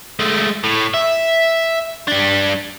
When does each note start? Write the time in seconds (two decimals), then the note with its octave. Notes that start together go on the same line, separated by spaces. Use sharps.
0.20 G#3 A3
0.64 A2
0.94 E5
2.08 G3 D4